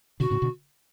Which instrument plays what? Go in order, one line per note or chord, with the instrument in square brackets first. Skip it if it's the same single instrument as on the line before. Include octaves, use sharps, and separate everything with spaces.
[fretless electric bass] B2 D3 [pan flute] F#4
[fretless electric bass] A2 C#3
B2 D3